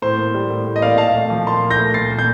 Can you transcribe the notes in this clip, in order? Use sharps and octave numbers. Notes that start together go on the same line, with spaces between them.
A2 C5
A#3
G3
A2
A2
D#5
A#3 D5 F5
A#2 F5 A5
A3
F3
A#2 A5 C6
A#2
G6 A#6
A3
A#2 A6 C7
A#3
G6